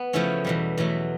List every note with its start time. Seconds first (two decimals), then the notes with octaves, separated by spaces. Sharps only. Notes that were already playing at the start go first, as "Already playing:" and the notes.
Already playing: B3
0.13 C#3 F3 A3 C#4 E4
0.45 E2 B2 G3
0.78 E2 B2 F#3 A3